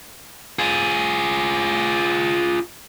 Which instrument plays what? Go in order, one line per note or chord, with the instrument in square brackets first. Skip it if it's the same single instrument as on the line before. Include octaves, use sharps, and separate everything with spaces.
[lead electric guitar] F4 G#4